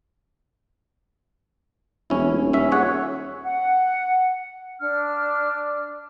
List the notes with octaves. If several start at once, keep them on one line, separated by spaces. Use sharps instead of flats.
E1 C#4 E4
D#1
C#4 E5
G#4 C#5 F#5
F#5
D4 F6